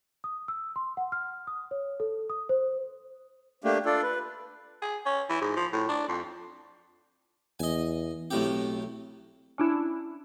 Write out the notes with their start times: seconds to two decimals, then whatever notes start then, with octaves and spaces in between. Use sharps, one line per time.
0.24 D#6
0.48 E6
0.76 C6
0.97 F#5
1.12 F6
1.47 D#6
1.71 C#5
2.00 A4
2.30 D#6
2.49 C5
3.64 A3 A#3 D4 G4
3.85 D4 F4 A4 D5
4.02 B4
4.82 G#4
5.05 C#4
5.29 E3
5.41 G#2
5.56 F3
5.73 A2
5.89 D4
6.08 F2
7.60 E2 D#5 G#5
8.31 B1 A2 C4 G4
9.58 C#4 D4 E4